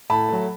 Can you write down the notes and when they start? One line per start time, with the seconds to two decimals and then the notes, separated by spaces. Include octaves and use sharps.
0.10 A2 A5 B5
0.29 F#3 A3